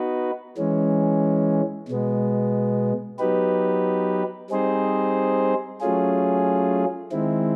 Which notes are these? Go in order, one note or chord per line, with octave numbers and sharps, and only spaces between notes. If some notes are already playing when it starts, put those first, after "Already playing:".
Already playing: B3 D#4 F#4 B4
E3 G#3 C#4
B2 G#3 B3
F#3 B3 D#4 G4 B4
G3 C4 D#4 G#4 C5
F#3 A3 C#4 F4 G#4
D#3 G#3 C4 E4